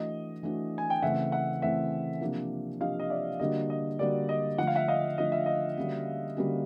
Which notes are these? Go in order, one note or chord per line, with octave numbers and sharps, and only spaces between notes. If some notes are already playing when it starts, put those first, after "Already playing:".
Already playing: E3 A3 D4 F#4 D#5
E3 A3 D4 F#4
G#5
G5
C#3 E3 A3 C4 E5 F#5
E5 F#5
C#3 E3 A3 C4 E5 F#5
C3 F3 A#3 D4 G4
C3 F3 A#3 D4 G4 D#5 F5
D#5
D5 E5
D3 G3 A#3 D4 F#4 D#5
D#5
D3 G3 A#3 D4 F#4 D5
D#5
D3 F3 A3 D4 F4 F#5
F5
E5 F#5
D#5 F5
D3 F3 A3 D4 F4 D#5
E5
D#5
D3 G3 A#3 C#4 F#4
D3 G3 A#3 C#4 F#4